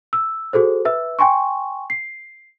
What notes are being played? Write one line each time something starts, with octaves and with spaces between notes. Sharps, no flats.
E6
F#4 G#4 A4 C5
B4 E5 E6
G5 G#5 C6 C#6
C7